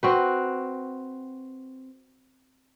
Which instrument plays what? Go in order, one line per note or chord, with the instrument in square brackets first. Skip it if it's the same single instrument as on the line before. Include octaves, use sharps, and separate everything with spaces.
[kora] C4 F#4 B4